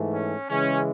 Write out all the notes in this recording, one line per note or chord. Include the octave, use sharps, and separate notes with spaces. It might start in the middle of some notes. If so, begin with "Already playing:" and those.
Already playing: G#2 E3 A3
C#4
C#3 E3 G#3 C#4